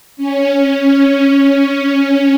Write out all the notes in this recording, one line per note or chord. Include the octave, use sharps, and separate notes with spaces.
C#4